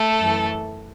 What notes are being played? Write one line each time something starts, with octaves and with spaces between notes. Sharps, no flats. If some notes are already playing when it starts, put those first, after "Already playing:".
Already playing: A3 A4
F#2 E3